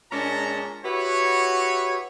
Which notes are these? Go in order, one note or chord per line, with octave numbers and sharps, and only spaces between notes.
A#2 G#3 C#4 D4 A5 A#5
E4 F#4 G4 B4 C#5